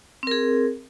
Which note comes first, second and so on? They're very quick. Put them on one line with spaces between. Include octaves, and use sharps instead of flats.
C4 A#4 G#4